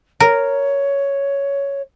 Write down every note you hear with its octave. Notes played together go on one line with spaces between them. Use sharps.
A#4 C#5